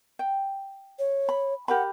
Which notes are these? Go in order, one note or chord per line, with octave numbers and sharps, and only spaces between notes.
G5
C#5
B5
G4 A#4 F#5 B5